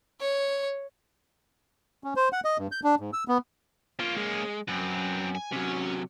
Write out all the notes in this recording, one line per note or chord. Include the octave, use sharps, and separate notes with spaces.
C#5
C#4
C5
F#5
D#5
G2
G6
D4
G#2
E6
B3
A#3 C#4 F4
G#3
F#2 C4 B4
G#5
C3 F#3 C#4